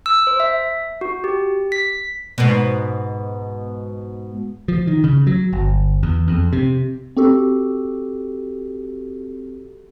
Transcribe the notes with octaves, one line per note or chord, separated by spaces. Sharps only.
E6
C5
E5
F#4
G4
B6
G#2 B2
F3
D#3
C#3
F#3
G1
E2
F2
C3
C4 F#4 G4 A4